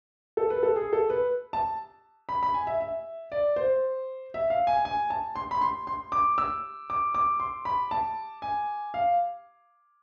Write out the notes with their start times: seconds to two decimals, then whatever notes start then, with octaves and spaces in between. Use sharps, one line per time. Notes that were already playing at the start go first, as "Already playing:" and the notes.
0.37 A4
0.50 B4
0.63 A4
0.76 G#4
0.93 A4
1.10 B4
1.53 A5
2.29 B5
2.43 B5
2.54 G#5
2.67 E5
2.81 E5
3.32 D5
3.56 C5
4.34 E5
4.50 F5
4.67 G#5
4.85 G#5
5.10 A5
5.36 C6
5.51 B5
5.61 C6
5.87 C6
6.12 D6
6.38 E6
6.90 D6
7.15 D6
7.40 C6
7.65 B5
7.91 A5
8.42 G#5
8.94 F5